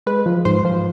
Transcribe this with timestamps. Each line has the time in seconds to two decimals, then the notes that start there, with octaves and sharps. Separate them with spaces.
0.07 G#3 B4
0.26 F3
0.45 G#2 C5
0.65 F3